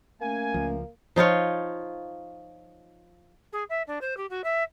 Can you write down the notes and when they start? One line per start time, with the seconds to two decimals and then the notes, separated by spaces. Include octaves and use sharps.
0.21 A3 A#3 C#4 G#5
0.54 C#2 F3
1.16 F3 D#4 F4 C#5
3.52 G#4
3.70 E5
3.87 D4
4.01 C5
4.17 G4
4.30 F#4
4.44 E5